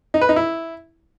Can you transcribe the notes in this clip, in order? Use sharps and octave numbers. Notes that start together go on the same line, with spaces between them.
D#4
B4
D#4
E4